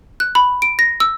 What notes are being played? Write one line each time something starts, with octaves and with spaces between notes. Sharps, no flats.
F#6
B5
D7
A#6
E6